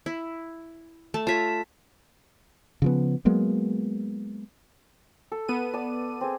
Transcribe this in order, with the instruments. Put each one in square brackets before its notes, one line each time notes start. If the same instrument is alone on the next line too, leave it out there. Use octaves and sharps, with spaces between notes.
[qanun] E4
A3 A5
[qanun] F4 C#5 E5 [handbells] A5 B6
[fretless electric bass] C#3 F3 B3
F#3 G#3 A#3 B3
[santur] A4
[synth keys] B3 D#7 [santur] A4
[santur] D5 A5
C4 G#4